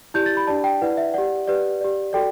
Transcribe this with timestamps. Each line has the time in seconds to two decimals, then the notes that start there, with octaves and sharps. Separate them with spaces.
0.14 E4 G4 D5 G6
0.26 A6
0.37 B5
0.47 D4 G4 D5 A5
0.64 G5
0.82 E4 B4 D5 F#5
0.97 E5
1.14 G4 D5 F#5
1.47 G4 B4 D5
1.81 G4 D5
2.13 F#4 A4 D5 G5